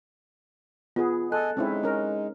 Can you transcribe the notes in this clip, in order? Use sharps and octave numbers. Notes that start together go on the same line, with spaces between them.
B3 F4 G#4
A4 D#5 G#5 F#6
G#3 C4 C#4 D#4 E4
C#4 A#4